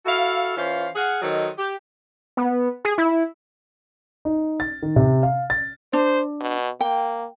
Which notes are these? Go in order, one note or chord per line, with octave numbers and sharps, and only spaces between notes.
E4 F#4 A4 F5
E3 C#4 F4 C5 F5
G#4 F5 F#5
D#3 F#3 A4 C5 D#5
G4
B3
G#4
E4
D#4
A6
D#3
C3
F5
A6
D4 C5
B2
A#3 G5